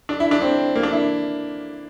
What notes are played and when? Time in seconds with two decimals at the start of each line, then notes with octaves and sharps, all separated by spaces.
0.09 D4
0.20 E4
0.31 D4
0.42 C4
0.76 A#3
0.83 D4
0.92 E4